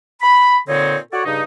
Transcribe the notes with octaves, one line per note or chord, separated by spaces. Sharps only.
B5
A#2 D3 C4 D#4 C#5
F#4 A4 C#5 D5 F#5
G2 C#3 D#4